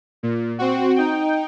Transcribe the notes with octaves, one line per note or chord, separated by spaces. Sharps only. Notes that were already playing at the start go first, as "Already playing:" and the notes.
A#2
C4 F#4
D#4 G5